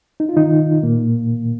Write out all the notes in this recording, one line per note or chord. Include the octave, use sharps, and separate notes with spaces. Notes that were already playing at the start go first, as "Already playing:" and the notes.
D#4
F4
D#3 D#4
A#2 A#3